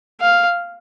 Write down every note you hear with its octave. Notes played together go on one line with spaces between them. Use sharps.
F5